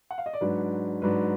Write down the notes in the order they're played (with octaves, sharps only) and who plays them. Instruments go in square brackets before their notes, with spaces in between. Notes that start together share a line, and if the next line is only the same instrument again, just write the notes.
[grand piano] F#5
F5
D#5
D5
G#2 F#3 D4 B4
G#2 F#3 D4 B4